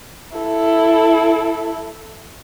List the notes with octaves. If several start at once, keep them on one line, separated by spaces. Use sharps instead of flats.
E4 A4